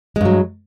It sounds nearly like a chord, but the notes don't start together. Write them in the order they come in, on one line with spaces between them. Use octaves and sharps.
G#3 G2 F#3